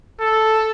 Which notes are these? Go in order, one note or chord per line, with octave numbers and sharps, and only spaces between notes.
A4